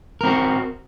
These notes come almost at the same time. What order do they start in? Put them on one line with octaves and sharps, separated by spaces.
A#4 C4 F#4